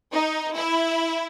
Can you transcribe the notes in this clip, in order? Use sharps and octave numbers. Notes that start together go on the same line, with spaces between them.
D#4
E4